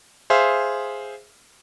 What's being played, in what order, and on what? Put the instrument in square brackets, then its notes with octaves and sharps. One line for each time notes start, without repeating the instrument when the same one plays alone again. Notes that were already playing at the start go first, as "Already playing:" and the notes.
[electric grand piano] G#4 C5 E5 F5